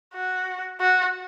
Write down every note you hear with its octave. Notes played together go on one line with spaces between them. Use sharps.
F#4
F#4